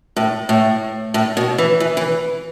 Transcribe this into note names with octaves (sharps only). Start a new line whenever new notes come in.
A2
A2
A2
B2
E3
E3
E3